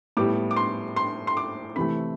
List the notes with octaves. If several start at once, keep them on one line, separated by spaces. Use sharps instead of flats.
A2 G3 B3 D6
D6
C6
C6
C6
D6
C3 E3 A3 B5